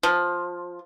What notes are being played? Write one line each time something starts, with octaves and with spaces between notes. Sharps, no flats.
F3